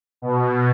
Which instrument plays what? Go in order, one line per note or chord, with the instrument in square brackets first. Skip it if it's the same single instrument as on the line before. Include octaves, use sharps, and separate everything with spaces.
[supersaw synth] B2